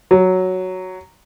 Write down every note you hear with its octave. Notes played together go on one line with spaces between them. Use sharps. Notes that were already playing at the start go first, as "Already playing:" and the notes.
F#3